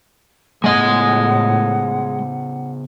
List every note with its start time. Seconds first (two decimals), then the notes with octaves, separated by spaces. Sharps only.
0.64 A2 C#3 G#3 B3 D#5 F#5 G#5